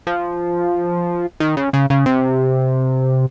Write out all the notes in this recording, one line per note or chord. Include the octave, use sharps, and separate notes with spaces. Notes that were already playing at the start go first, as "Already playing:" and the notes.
F3
D#3
C#3
C#3
C#3
C3